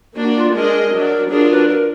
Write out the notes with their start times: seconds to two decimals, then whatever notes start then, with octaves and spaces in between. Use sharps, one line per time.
0.17 A#3 D4 F#4
0.37 F4
0.55 G#3 D4 G#4 A#4 D#5
0.93 F#3 D4 F#4
1.31 F#3 D4 F4 G#4 A#4
1.51 B4
1.69 A#4